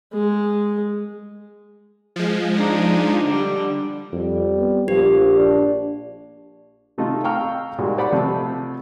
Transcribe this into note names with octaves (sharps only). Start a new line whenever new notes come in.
G#3
F3 G#3
D4 D#4
D3 G3
F2 G3
B3
A#1 F3 G4
D4
C3 A3 D#4 F4
F5 G5 A#5 C#6 E6 F6
A#2 G3 G#3 D#4 F#4
C5 D5 F#5 B5
C3 F3 A3